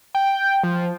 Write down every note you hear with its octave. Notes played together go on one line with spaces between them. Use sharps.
G5
F3